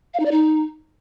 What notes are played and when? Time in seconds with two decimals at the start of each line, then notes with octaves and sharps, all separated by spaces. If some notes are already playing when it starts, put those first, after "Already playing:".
0.14 F5
0.20 D#4
0.25 D5
0.31 D#4